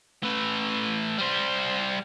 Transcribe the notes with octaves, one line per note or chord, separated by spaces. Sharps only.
A3 B4
G3 C5